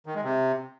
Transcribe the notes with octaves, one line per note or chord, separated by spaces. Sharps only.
D#3
G#3
C3